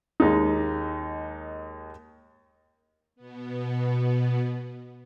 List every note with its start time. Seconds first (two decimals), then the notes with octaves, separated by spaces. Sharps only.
0.20 D#2 G#3 D#4
3.16 B2 B3